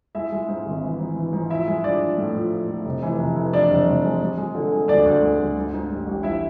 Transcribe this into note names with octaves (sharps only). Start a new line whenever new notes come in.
G#3 E4 E5
G#3
G#2
G#1
E3
G#2
E3
G#2
F3 E4 E5
G#3
F3 D4 D5
F3
A2
F3
F3
A2
F1
E3
F1
E3
E3 D4 D5
F1
F1
G#3
G#3
G#3
D3
G#3
D2 D4 D5
D2
G#3
D2
G#2
G#2
A1
A1
G#2 E4 E5